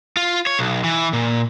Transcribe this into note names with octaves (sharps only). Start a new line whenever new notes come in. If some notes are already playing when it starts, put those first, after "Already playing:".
F4
C#5
B1
E3
A#2